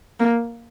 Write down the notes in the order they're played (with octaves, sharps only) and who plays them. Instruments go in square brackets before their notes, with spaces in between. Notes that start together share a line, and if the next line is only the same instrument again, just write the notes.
[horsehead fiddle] A#3